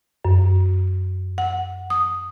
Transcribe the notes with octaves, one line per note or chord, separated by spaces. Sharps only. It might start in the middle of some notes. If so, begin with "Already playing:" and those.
F#2
F#5
D#6